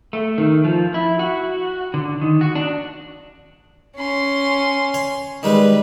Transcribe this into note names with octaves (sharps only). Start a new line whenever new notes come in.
A3
D#3
F3
E4
F#4
D3
D#3
F#4
D4
C#4 C6
C#5
D#3 G3 G#3 B4